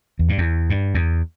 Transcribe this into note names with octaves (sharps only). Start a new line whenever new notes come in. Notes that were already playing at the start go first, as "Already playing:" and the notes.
E2
G2
E2
G2
E2